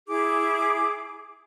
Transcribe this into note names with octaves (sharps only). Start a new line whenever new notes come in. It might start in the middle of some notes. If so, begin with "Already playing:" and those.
E4 G#4 D6